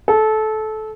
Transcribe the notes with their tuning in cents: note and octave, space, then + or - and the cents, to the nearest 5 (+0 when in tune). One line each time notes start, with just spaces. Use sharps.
A4 -20